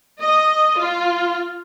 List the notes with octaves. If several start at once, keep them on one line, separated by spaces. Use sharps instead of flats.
D#5
F4